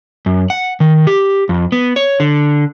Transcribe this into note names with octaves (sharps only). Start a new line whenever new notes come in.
F#2
F#5
D#3
G4
F2
B3
C#5
D3